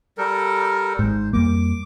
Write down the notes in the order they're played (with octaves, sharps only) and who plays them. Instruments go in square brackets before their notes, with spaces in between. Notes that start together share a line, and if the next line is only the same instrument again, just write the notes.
[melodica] G3 A4 A#4
[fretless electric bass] G#1 G#2 [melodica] C5
[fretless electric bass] F2 G3 A#3 [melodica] D6